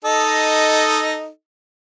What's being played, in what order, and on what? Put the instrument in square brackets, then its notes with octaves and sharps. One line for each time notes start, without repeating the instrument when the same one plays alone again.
[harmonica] D#4 A4 D#5